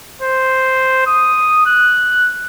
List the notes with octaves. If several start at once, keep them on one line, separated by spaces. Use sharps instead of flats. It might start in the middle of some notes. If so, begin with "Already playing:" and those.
C5
D#6
F#6